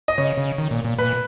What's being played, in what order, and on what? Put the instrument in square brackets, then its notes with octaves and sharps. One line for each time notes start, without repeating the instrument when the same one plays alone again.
[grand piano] D#5
[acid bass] C#3 [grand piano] C#5
[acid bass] C#3
D#3
A#2
A#2
[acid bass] A#2 [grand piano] B4